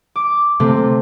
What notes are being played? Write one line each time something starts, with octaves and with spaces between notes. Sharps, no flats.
D6
C3 A3 C4